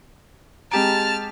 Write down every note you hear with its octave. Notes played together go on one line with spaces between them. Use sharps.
G#3 C4 G4 A5 A#5 F6 D7